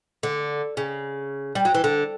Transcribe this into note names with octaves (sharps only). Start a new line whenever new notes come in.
D3
C#3
G3
F#3
E3
D3